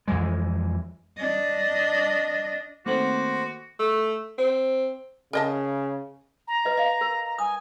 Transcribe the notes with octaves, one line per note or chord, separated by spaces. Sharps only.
F2 E3 G#3
D4 D#5
D#3 A3 A#3 C4 F#4 C5 F#5 D6
A3
C4
C#3 A#4 D#5 A5
A#5
B4 D#5
D#5 F5
A#4
A#5
G#5 D#6